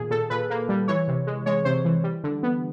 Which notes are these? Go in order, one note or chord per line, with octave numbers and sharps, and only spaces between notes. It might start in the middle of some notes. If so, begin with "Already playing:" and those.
Already playing: A#2 D#3 G#4
A#2 A4
A#2 B4
A#3
G3
E3 C#5
C3
G#3
G#3 C#5
C3 C5
E3
G3
D3
B3